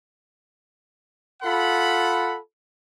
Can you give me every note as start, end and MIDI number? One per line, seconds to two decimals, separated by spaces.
1.42 2.37 65
1.42 2.37 69
1.42 2.37 78
1.42 2.37 83